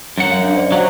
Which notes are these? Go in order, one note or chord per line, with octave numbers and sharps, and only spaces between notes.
F#2 F#5
F5 F#7
D4
C5 D5 D#5
F#3 F5 F#5